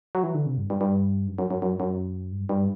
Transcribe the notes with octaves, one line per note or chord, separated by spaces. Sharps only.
F#3
E3
D3
C3
G2
G2
G2
F#2
F#2
F#2
F#2
F#2
G2
G2